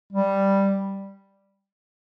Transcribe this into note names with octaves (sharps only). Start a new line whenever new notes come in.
G3